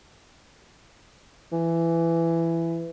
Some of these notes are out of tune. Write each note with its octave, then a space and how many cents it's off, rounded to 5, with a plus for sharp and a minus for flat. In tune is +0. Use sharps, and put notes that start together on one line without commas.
E3 +15